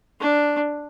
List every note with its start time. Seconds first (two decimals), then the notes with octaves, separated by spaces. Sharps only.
0.21 D4